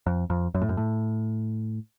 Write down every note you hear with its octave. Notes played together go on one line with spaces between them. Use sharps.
F2
F2
F#2
A2
F#2
A2